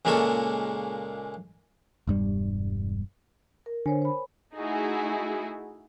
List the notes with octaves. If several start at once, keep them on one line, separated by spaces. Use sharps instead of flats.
C#2 A#2 G#3 A#3 A4 C#6
E1 G2 G3
A#4
D3 C5 C#5 G#5
C5 B5
A3 D#4 E4 F#4 G#4